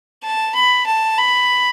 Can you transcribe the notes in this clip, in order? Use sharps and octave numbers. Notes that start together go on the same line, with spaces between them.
A5
B5
A5
B5